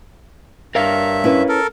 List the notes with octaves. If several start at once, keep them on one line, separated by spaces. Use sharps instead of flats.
G2 A#4 C#5 E5 F5
C#4 E4 B4
A4 A#4